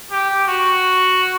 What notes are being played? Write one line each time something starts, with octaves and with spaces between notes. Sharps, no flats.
G4
F#4